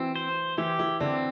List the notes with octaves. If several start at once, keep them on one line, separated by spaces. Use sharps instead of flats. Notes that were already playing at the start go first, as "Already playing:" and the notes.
Already playing: E3 C4 E4 F#4
C5
E3 E4 G4
E3 E4
D3 C4 D4